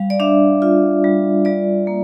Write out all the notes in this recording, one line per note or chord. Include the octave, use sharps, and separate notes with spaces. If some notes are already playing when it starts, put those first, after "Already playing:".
Already playing: G3 F5
D5
D4 E5
F4
G3
G3 D5
A#3